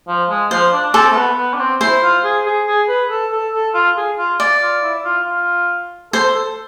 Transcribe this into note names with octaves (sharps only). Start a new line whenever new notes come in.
F3
G#3
F3 C5
D4
D4
C4 A4
A3
B3
B3
D4
C4
E4 C5
F4
G#4
G#4
G#4
B4
A4
A4
A4
F4
G#4
F4
D5
F4
E4
F4
F4
A4 C5
A4